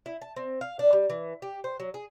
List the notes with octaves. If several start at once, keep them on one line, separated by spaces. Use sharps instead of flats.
E4
A5
C4
F5
D4
G3
E3
G4
C5
F#3
G#4